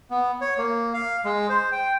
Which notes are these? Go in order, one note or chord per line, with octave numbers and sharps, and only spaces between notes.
B3
C#5
A#3
F5
G#3
C5
G5